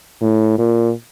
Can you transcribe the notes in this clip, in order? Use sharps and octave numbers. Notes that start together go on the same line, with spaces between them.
A2
A#2